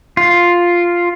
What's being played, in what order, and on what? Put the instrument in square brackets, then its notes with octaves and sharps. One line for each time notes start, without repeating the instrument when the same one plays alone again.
[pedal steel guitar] F4